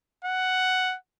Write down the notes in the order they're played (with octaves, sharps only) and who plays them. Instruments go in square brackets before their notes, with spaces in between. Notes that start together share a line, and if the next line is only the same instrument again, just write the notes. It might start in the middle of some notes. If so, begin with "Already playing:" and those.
[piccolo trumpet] F#5